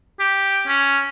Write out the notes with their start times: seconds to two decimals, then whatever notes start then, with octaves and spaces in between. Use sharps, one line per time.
0.20 G4
0.67 C#4